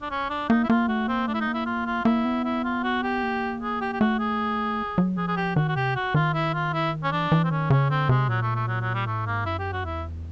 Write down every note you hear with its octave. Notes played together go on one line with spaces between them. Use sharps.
D4
C#4
D4
A#3 D#4
E4
A#3 F4
A3 F#4
A#3 C4
A3 D4
E4
D#4
A#3
E4
F4
F4
A#3 E4
B3
E4
F4
F#4
G4
A#3
G#4
G4
G4
A3 F#4
G#4
F#3
F3 G#4
G#4
G4
D#3 F#4
F#4
C3 G4
F#4
D#3 F4
E4
F4
E4
C#4
E3 D4
E3
C4
D#3 C#4
C#3 C#4
D3 C4
C3 G#3
A#2 F#3
A3
A3
F#3
F#3
G3
A2 A3
G#2 A#3
F#2 E4
G4
F#4
E2 E4